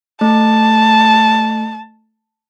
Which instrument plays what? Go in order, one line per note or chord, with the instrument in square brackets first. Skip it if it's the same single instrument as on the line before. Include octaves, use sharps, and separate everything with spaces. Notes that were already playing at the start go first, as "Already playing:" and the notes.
[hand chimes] A3 [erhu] A5